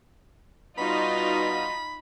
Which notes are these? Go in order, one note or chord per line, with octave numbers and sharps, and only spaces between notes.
B2 G3 D#4 F4 F#4 B5